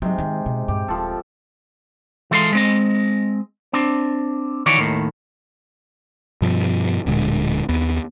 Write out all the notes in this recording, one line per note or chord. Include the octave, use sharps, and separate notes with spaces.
G#2 C3 F#3
D#3 G#3
B2
G2 A#2 G4
D#1 F3 A4
E3 G#3 A4 C#5 F5 C6
G#3 C4 D#5
C4 D4
D#3 E3 F#4 C#5 D5
D#2 A2 D#3
G2 B2 F3
D1 A#2 D3 G#3
D#2 B3